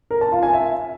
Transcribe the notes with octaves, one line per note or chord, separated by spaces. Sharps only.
A#4
A5
F4
G#5
E5